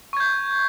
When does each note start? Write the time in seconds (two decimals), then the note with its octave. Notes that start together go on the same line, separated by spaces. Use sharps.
0.13 C#6
0.17 G#6
0.20 G6